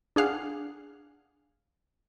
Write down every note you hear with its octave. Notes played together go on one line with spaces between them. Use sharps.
D4 G#4 F5 F#5